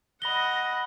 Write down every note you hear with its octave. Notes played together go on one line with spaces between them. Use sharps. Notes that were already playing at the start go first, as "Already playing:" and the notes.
D#5 F#5 B5 A#6 G7